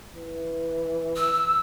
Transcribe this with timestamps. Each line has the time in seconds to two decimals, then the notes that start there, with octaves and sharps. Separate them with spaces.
0.14 E3
1.16 E6